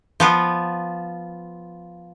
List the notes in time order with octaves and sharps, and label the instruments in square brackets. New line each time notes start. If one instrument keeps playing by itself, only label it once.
[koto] F3 B3 F4